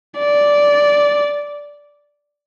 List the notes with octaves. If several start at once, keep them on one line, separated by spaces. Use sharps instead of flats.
D5